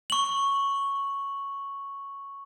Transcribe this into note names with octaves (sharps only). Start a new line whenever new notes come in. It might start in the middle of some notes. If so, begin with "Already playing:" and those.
C#6 F#7